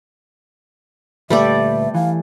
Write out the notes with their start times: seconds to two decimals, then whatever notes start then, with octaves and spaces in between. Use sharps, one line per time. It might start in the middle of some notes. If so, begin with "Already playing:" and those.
1.30 D2 A#2 G3 A3 B4 D5 E5
1.95 E3 F5